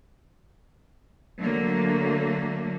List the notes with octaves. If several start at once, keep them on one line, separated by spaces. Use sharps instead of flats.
D3 F#3 A3 A#3